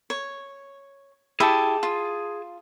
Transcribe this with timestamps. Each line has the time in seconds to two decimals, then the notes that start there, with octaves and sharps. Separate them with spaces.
0.10 C#5
1.40 E4 G4 G#4 A5
1.83 F4